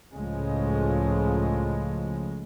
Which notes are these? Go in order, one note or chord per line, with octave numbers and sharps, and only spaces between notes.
C#2 A2 C#3 F3 G#3